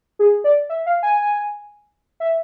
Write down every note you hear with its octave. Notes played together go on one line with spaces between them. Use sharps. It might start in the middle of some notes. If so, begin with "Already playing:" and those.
G#4
D5
E5
F5
G#5
E5